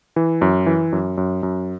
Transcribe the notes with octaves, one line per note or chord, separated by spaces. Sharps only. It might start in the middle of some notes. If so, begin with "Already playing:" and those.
E3
F#2
E3
F#2
F#2
F#2